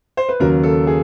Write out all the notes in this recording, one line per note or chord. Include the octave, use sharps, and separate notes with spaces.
C5
B4
D#2 C#3 F#3 A#4
A4
G#4